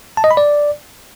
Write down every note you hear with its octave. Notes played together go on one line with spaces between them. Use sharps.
A5
D#5
B5
D5